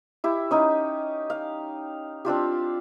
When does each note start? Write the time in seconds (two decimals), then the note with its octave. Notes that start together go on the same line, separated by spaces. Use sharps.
0.24 E4 G4
0.51 C#4 D#4 G4
1.30 F5
2.25 C4 D4 F4 G4